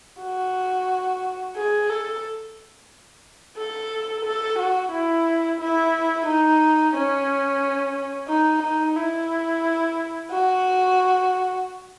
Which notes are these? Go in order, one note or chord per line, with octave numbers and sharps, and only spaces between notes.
F#4
G#4
A4
A4
A4
F#4
E4
E4
D#4
C#4
D#4
D#4
E4
F#4